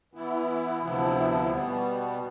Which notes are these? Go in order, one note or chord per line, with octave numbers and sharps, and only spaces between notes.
E3 B3 E4
D2 C3 F3 B3 E4
B2 G3 B3